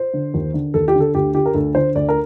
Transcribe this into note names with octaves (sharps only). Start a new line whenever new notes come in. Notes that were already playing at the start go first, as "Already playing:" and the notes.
Already playing: C5
D3
D#2
D3
D#2 A4
G4
D3
A4
D2 G4
D3 G4
A#4
D2 A4
D3 C5
D2 D5
A#4